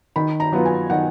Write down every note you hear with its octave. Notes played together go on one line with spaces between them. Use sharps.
D#3 B5
A#5
F#3 B3 F4
G#5
D#3 F#5